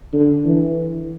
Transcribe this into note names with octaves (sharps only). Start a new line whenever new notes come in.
D3
E3